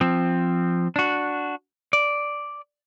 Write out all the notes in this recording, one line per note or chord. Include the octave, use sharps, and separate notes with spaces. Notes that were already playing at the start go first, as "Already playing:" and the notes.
F3 C4
D4 F#4
D5